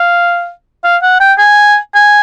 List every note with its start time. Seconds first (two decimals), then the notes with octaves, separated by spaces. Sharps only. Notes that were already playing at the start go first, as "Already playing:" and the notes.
Already playing: F5
0.84 F5
1.02 F#5
1.20 G5
1.39 G#5
1.95 G#5